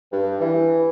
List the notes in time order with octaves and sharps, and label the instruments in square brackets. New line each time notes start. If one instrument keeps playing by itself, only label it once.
[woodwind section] G2
E3